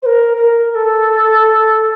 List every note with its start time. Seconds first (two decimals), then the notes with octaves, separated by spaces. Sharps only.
0.02 C5
0.06 A#4
0.37 A#4
0.71 A#4
0.74 A4